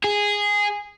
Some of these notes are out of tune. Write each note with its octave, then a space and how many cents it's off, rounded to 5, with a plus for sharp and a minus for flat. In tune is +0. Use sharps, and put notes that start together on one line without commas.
G#4 -10